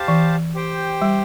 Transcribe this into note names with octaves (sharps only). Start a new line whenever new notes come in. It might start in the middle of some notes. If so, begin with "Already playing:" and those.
Already playing: G4 C5 F5 A5
E3
G4 C5 G5
G3